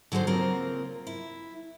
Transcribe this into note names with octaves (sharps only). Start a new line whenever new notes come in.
D3 F#3 G#4 A4 C5
C#3 A#3 C4 F4 A#4
E4